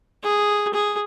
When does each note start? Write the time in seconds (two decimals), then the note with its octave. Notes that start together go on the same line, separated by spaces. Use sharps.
0.23 G#4
0.73 G#4